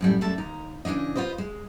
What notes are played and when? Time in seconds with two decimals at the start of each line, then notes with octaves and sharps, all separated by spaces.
0.01 F#2 A2 G3
0.21 F#2 G3 A3 E5 A5
0.38 D#2 D#4 A#5
0.85 C#3 E3 F#3 D4 D#5
1.15 F4 G4 B4 C5 D#5
1.38 G#3